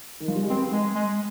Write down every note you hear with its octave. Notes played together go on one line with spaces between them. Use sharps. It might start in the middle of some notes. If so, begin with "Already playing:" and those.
D#3
F3
G3
G#3
B3 C4
G#3
G#3